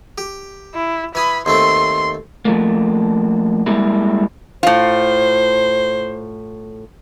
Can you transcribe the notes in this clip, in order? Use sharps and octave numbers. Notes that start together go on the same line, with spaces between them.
G4
E4
E3 G#5 B5 D#6
D#2 A3 C4 C6
F3 A3 A#3
G3 G#3 A#3 E4
A2 F4 C5